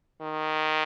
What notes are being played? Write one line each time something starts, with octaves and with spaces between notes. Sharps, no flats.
D#3